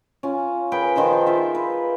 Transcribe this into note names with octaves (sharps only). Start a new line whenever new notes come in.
C#4 F4
G#4 A#4 B4 G5
D#3 F3 D#4 C5
F4 A#4 E5
B4